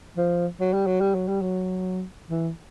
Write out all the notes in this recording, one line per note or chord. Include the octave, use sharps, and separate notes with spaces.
F3
F#3
G3
F#3
G3
F#3
G3
F#3
E3